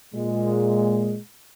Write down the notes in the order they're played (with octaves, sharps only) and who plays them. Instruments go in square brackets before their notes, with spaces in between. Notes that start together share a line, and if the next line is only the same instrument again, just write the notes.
[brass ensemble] A#2 G#3